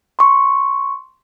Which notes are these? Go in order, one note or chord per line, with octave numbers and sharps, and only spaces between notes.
C6 C#6